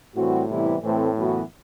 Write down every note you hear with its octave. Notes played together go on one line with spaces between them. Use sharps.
A2 E3 G3 C4 F#4
C3 E3 G3 B3 E4
A2 E3 A3 C4
F#2 E3 B3 F#4